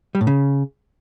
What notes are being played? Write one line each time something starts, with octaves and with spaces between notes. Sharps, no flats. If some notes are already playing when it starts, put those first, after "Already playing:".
G3
A2
C#3